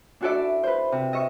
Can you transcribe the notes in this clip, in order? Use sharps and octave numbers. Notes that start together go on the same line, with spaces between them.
D4 E4 F#4 A4 D5 E5
B4 C5
C3
D#5 E5 C#6